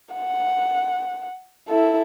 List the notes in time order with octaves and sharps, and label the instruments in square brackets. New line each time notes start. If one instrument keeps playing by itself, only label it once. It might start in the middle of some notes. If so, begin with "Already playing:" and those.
[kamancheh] F#5
E4 A4